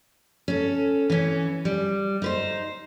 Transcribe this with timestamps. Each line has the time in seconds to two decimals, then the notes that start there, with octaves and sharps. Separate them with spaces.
0.48 C#4 A4
1.10 E3 C#4
1.65 G3
2.22 D#4 B4 C5